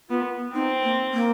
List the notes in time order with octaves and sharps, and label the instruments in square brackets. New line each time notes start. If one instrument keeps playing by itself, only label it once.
[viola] B3 [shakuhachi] F4
[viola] C4 [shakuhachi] D#4
[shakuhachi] A#3
A#3